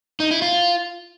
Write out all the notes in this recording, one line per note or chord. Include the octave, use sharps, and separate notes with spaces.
D#4
E4
F4